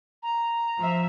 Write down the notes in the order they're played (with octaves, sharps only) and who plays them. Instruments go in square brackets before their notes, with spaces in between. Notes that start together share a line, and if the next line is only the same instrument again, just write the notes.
[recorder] A#5
[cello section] F3 E5